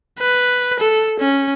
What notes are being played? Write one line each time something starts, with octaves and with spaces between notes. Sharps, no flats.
B4
A4
C#4